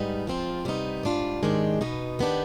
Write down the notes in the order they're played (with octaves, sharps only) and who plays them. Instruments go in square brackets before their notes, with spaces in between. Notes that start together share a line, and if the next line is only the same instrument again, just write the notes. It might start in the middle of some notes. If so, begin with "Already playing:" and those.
Already playing: [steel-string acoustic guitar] G#2 G3 B3 D#4
F3 G#3 C4 F4
C3 G3 B3 D#4
G#2 G3 D4 F4
G#2 D#3 G#3 D4 G4
B2 B3 D#4
D#3 B3 D4 G4